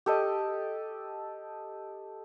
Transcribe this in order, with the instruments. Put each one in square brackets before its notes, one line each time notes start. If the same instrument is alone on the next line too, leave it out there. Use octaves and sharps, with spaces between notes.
[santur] G4 A4 D#5